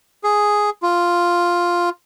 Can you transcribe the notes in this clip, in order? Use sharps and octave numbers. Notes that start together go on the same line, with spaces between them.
G#4
F4